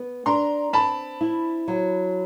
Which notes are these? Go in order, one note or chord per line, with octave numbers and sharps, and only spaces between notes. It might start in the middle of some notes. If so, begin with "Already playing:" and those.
Already playing: B3
D4 A#5 C6
C4 A5 B5
E4
F#3